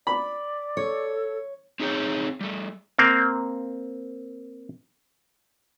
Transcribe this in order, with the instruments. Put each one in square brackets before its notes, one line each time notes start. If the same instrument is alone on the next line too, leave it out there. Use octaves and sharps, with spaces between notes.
[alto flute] D5 [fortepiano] B5
[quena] A4 [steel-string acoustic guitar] C#5
[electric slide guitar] C4 D#4 G#4 C5 C#5 G5
G3 A3
[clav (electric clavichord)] A#3 C4